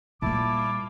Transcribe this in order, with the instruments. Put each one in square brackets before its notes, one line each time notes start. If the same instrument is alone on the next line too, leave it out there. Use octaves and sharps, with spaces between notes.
[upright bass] A#2 G3 [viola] A#3 [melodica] E4 A5 [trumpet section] D6